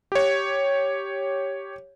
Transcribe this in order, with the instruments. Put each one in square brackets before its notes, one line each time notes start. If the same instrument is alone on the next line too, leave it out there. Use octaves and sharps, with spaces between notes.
[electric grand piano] G4 C#5